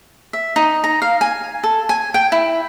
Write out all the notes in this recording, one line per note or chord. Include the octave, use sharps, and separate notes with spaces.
E5
D#4
A#5
F5
G#5
A4
G#5
G5
E4